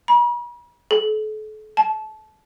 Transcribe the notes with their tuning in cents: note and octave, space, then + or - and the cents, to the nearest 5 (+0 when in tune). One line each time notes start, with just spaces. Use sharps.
B5 -45
A4 -40
A5 -25